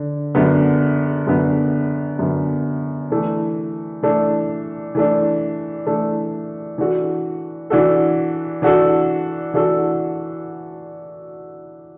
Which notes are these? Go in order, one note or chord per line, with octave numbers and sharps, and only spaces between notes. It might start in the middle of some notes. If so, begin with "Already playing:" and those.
Already playing: D3
F#2 D3 B3
F#2 D3 B3
F#2 D3 B3
E3 A3 D4
E3 A3 D4
E3 A3 D4
E3 A3 D4
E3 D4 F#4 A4
E3 D4 F#4 A4
E3 D4 F#4 A4
E3 D4 F#4 A4